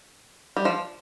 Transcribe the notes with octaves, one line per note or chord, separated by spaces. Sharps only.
G3
F3